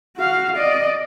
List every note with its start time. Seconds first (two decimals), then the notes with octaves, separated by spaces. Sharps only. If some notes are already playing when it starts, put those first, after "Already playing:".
0.17 F#4 F5
0.57 D5 D#5